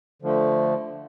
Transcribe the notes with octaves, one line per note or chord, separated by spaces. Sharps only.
D3 F3 A3